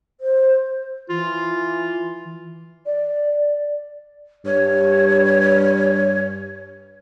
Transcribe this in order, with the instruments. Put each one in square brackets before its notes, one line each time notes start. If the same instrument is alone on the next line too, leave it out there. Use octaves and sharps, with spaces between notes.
[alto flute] C5
[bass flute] E3 [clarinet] F4
[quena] D5
[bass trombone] G2 [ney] C#5